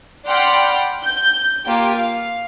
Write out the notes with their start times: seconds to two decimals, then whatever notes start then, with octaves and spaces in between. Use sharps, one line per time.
0.24 D5 F#5 G5 B5 C6 F6
1.04 G6
1.64 A#3 F4 G4
1.94 F5